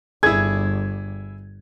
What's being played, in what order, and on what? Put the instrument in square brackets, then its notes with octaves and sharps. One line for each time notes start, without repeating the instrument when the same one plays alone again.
[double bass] G1 G2 [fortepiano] E4 G#4 [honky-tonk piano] G#6